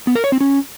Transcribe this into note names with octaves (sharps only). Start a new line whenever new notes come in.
B3
A#4
C#5
C4
C#4